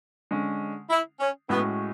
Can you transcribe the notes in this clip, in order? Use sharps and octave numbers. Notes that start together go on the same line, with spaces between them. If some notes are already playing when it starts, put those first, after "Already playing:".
D3 G#3 C#4
E4
C#4
A2 G#3 B3 C#4 F#4